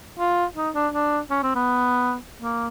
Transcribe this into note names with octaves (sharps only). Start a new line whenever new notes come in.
F4
D#4
D4
D4
C#4
C4
B3
A#3